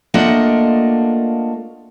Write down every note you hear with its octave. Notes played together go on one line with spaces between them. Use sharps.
A3 A#3 D4 F4 D#5 F#5